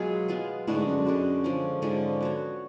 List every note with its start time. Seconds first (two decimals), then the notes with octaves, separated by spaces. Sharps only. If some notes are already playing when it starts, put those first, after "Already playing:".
Already playing: B2 F#3 G#3 B3 F4 G#4
0.28 G#3 B3 F4 G#4
0.67 A2 D3 G#3 D4 F#4
0.77 G#2
0.86 F#2
0.96 F#2
1.06 D3 G#3 D4 F#4
1.44 D3 F3 G#3 C#4
1.82 G#2 D3 F3 G#3 C#4
2.21 B3 F#4 C#5